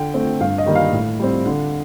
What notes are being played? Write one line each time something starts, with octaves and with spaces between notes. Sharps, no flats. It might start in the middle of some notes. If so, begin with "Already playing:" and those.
Already playing: D3 G5
A3 C4
G2 F5
D#5
D#3 G3 A#3
F5
A2
G3 C4
D3